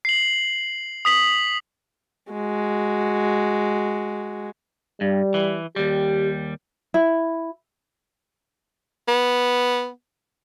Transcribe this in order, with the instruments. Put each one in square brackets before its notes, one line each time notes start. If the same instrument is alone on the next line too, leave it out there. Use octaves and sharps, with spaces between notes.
[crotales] C7 F#7
D#6 B6 F#7
[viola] G#3 F#4
[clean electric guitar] G2 [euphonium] G3
[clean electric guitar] E3
[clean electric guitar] D#2 G3 [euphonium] G4
[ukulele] E4
[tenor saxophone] B3